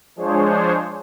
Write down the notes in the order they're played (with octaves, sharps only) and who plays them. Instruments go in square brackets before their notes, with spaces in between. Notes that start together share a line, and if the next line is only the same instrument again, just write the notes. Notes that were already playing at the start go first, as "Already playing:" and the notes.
[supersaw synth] F3 G#3 D4 G#4 C5 C#5